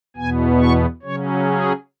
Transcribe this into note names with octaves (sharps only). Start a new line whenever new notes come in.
E2 B2 B3 G#5
C#6
C#3 F#3 C#4 C#5
G#4